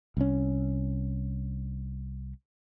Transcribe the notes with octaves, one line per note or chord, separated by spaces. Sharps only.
C2 C#4